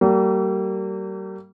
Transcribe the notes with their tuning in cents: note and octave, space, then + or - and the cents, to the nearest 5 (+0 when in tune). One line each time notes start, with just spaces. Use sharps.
G3 -40 A#3 -35